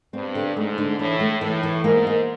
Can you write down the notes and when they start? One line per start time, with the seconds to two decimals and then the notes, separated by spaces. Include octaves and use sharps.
0.13 G2 C4
0.35 D3
0.56 G#2 A3
0.78 D3
0.99 A2 E3
1.20 A3
1.41 A2 E3
1.63 E3
1.84 G#2 A#3
2.07 A#3